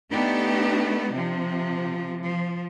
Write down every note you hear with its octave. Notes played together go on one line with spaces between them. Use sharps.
A3 B3 D4 D#4 G4
C3 F3
F3